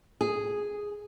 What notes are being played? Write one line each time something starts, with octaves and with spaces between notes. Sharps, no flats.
G#4